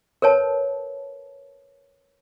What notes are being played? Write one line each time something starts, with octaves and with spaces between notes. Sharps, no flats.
A#4 B4 C#5 A5